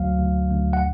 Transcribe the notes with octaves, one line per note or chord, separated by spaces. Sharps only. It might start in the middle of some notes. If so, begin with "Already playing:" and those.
Already playing: D2 F#3 F5
D2
D2
F#5